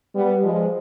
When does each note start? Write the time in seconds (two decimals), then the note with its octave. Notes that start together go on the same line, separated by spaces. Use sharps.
0.15 G3 B3
0.44 F3 G#3